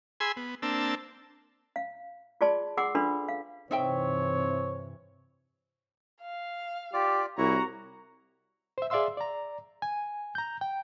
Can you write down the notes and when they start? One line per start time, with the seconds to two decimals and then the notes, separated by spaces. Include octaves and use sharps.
0.20 G#4 G#5 B5 C6 E6
0.36 B3
0.62 A#3 C4 D4 A5 E6
1.76 F5
2.41 F4 G#4 D5 A5 C6
2.77 G#4 F#5 C6 D6 E6
2.95 D4 F4 A4 B4 B5 C6
3.29 F5
3.71 G2 C3 E3 C4 D#4 C#5 E5 G5
6.21 F5
6.93 F4 G4 D5
7.38 C2 E4 F#4 C#5 A#5
8.78 C5 E5
8.90 G#4 D5 E5 F5 C6 E6
9.17 D5 A#5
9.82 G#5
10.35 A#5 G6
10.61 G5